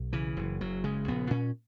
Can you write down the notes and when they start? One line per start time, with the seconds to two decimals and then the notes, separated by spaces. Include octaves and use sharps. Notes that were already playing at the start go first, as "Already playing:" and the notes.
Already playing: B1
0.13 C#3 E3
0.37 F#1
0.61 F#1 F#3
0.84 C#3 G#3
1.08 A#1 B3
1.30 A#2 C#4